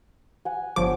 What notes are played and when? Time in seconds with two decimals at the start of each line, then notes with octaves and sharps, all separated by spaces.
0.45 F#5 G#5
0.76 G1 F3 C#5 D6